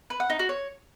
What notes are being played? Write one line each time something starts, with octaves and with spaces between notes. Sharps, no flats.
B4
F#5
D#4
F#4
C#5